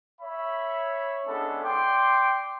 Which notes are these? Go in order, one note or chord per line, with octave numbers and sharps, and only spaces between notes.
C#5 E5 B5
G#3 B3 C#4 D4 E4 A4
D5 G5 C6 D6